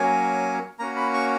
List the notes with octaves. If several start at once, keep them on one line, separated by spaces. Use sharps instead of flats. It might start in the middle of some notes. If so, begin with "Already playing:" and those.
Already playing: F#3 A#3 C#4 G#5
A#3 C#4 F#4 A#5
B5
C#6